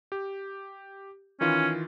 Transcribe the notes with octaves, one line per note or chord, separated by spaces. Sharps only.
G4
D#3 E3 C#4 F4